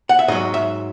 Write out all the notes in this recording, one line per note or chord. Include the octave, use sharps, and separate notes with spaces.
F#5
E5
G#2 F#3 D#5
E5